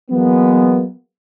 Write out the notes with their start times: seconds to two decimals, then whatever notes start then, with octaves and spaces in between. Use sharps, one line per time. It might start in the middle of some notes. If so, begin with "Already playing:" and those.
0.11 E3 F#3 G#3 A#3 B3